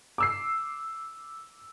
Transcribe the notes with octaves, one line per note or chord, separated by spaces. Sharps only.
D6 E6 C7